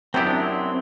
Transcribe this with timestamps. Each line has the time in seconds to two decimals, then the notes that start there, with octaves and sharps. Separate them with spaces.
0.14 F#2 F#3 B3 C4 E4 G4
0.27 D4
0.40 C4